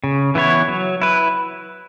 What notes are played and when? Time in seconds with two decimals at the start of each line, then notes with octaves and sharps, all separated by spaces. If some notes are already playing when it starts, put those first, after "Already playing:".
0.04 C#3
0.35 E3 B3 E4 C#5
0.68 F#3
1.02 E4 B4